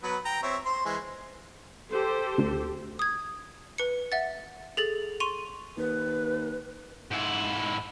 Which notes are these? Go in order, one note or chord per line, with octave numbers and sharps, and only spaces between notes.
F#3 B3 B4
G5 A#5
C4 C#5 E5
C5 C6
E3 G#3 C5
G4 A4 C5
D2
D#6 G#6
B4 C#7
E5 F#5 A6
G#4 A4 A6 F#7
C6 C#6 D#7 F7
D#2 B4
G#2 E4